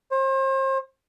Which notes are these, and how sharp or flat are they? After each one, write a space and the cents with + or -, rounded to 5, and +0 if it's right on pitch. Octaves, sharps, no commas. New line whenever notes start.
C5 +35